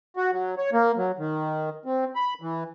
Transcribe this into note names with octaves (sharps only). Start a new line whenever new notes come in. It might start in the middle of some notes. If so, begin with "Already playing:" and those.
F#4
F#3
C#5
A#3
F#3
D#3
C4
B5
E3